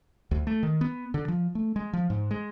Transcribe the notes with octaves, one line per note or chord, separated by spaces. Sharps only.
D2
A3
D#3
B3
D3
F3
A3
G#3
F3
G#2
G#3